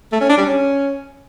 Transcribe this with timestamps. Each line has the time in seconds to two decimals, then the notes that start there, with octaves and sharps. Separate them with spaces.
0.12 A3
0.21 C#4
0.29 D4
0.37 G3
0.46 C#4